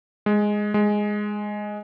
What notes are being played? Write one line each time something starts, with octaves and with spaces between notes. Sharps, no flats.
G#3
G#3